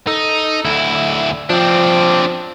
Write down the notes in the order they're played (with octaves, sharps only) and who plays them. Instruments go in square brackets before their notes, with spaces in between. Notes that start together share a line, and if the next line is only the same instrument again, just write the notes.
[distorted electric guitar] D#4 [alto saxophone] A4
[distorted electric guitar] D2 E4
[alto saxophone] F3 [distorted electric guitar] C4 D4